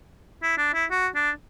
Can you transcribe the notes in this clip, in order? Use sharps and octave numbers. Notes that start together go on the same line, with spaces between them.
E4
D4
E4
F#4
D4